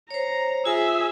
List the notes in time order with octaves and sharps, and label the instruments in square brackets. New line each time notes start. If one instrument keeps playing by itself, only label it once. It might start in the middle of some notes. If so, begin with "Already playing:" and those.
[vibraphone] C5 C#5 [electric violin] A#5
[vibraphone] F4 G#5 [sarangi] G#4 [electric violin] E5 E6